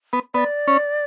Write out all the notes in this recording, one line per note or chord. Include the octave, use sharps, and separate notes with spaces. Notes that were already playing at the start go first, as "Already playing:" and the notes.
B3
B3 D5
C#4